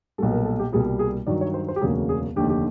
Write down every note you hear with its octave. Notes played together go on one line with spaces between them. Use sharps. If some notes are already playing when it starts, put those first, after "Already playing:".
B1 A#2 G3 A4
A#4
A4
G4
C2 B2 G3 A#3 G#4
G#4
G2 D#3 F#3 D5
C#5
C5
C5
G4
E1 D2 C#3 F#3 A#3 G#4
G#4
F1 D#2 D3 G4
G4